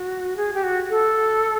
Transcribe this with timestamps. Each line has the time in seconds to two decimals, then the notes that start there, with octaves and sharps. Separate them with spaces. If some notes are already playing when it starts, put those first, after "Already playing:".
Already playing: F#4
0.37 G#4
0.54 G4
0.63 F#4
0.90 A4